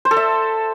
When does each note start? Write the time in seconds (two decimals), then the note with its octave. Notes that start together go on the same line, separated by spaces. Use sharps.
0.05 C5
0.11 A4
0.17 E5